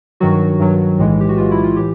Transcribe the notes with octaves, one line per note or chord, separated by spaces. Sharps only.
G2 D#3 F#3 F#4
G2 D#3 F#3
B1 A2 E3 G#3
G4
F#4
B1 A2 E3 G#3 F4
E4
F4
A2 E3 G4